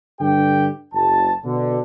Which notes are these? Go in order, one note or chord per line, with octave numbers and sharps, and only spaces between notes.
G2 D3 G4 G5
F#1 A5
B2 D3